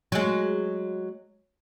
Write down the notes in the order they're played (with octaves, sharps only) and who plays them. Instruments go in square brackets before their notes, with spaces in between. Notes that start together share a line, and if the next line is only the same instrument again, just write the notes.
[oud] F#3 G#3